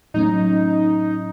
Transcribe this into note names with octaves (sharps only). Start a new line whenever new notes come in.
A2 F#3 A3 C#4 D#4